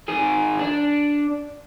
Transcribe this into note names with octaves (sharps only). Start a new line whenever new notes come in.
D#3 G#4
D4